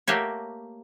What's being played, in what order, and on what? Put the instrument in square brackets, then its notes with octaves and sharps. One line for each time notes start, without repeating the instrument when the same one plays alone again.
[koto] A3 A#3 F#4 G4 C#5